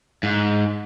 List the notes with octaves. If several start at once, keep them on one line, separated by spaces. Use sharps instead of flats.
G#2